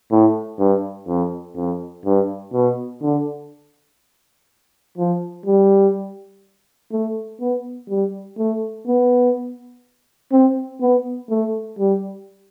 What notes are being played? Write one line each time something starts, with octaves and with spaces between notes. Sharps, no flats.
A2
G2
F2
F2
G2
B2
D3
F3
G3
A3
B3
G3
A3
B3
C4
B3
A3
G3